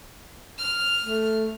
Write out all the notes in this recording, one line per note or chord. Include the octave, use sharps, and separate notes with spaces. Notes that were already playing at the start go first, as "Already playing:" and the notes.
F6
A3